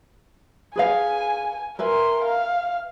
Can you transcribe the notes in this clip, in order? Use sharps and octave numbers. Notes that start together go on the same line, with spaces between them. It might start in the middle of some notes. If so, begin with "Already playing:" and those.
G#4 B4 F5 G#5
A#4 B4 E5 G#5 C6
F5